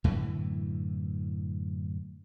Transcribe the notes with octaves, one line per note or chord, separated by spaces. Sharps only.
F#2 A2 D3 E3